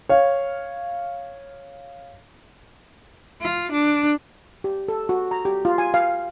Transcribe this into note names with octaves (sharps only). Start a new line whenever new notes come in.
C#5 F5
F4
D4
G4
A4
F#4
A#5
G4
F4
G#5
F5